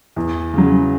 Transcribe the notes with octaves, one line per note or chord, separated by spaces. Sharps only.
E2
C#3 F#3